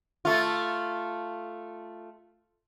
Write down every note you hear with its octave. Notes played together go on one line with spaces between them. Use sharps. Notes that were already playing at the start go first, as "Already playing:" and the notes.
A3 F4